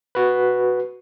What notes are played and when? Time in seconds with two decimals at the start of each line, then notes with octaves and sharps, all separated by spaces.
0.15 F#4 B4